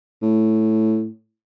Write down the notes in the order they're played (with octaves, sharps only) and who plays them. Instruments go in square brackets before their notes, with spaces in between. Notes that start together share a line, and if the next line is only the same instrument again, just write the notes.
[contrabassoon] A2